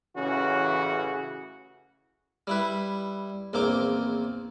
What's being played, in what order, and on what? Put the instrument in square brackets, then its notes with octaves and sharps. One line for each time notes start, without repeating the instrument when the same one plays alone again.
[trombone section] A1 C#3 E3 C#4 F#4
[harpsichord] G3 E4 B4
A#1 E2 A#3 C4 D6